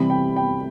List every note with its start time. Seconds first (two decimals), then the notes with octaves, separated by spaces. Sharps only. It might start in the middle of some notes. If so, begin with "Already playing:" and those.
Already playing: C3 E3 G3 C4 B5
0.10 G5
0.36 G5